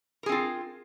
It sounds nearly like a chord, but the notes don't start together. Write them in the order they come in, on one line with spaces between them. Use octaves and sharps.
A#4 G#4 C4 F4